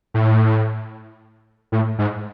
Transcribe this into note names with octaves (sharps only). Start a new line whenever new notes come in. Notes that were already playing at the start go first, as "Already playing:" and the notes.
A2
A2
G#2